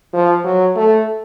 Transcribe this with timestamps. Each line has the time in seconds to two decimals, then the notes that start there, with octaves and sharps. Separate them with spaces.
0.14 F3
0.44 F#3
0.76 A3